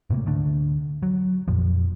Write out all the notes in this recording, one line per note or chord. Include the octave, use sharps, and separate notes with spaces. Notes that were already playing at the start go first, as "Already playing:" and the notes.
G#2 C3 A3 A#3
D2 D3 A3 D4
F#3
F1 F2 A#2 F3